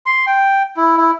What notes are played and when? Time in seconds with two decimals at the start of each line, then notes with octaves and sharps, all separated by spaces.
0.06 C6
0.27 G5
0.77 E4
0.97 E4